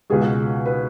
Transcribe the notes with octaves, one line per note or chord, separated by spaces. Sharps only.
C#2 B2 G#3 G#4
B4